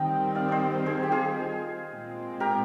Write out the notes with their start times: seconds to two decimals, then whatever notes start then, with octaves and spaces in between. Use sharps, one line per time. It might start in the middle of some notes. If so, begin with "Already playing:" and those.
Already playing: D#3 G3 C4 D#5 G5
0.35 D5 F5
0.49 C5 D5 D#5
0.86 G#4 C5
1.03 G4
1.12 F4 G#4
1.90 A#2 G#3 C4
2.40 G4 A#4